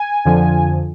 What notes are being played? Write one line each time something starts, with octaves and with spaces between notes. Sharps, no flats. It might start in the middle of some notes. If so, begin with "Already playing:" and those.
Already playing: G#5
F2 D3 F3